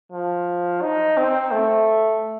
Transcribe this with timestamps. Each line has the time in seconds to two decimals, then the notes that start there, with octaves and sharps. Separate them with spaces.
0.12 F3
0.82 D#4
1.17 C4
1.52 A3